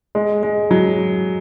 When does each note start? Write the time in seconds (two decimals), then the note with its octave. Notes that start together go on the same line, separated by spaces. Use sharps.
0.15 G#3
0.43 G#3
0.71 F#3